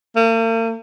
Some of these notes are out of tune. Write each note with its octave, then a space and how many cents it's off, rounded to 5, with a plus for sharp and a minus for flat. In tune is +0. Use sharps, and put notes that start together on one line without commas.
A#3 -45